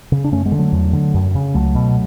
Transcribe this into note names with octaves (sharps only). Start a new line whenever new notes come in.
C#3
D4
F#2 A3 C#4
G#3 B3
D3
F#3 A3
E2
D3
F#2
C#3
C#2 F#3 A3
B2